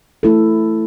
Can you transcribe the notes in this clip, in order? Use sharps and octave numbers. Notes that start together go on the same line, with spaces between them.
A3 E4 A4